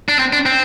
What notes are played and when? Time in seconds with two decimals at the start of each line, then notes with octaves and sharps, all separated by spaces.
0.09 D4
0.19 C4
0.33 D4
0.46 C4